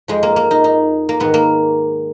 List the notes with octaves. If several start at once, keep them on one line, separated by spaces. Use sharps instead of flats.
F2 F3 G#3
A#3
A#3
D#4
D#4
A#3
G#2 D#3 B3
A#3